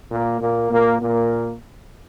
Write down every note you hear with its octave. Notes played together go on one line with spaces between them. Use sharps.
A#2 A#3
A#2 A#3
A#2 A#3
A#2 A#3